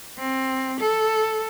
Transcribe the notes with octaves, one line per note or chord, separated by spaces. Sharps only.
C4
A4